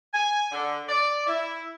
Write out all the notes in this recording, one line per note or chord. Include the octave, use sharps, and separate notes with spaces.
G#5
D3
D5
E4